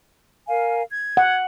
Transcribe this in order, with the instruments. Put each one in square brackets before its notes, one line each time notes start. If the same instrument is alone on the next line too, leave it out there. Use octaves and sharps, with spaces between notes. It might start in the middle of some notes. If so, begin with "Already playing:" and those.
[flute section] A#4 F5 G#5
G#6
[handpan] F#5